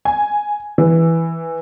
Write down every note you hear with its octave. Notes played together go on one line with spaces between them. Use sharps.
G#5
E3